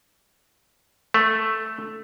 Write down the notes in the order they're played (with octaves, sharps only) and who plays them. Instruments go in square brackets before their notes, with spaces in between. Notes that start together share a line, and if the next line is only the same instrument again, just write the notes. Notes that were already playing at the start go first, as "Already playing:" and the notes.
[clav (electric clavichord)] A3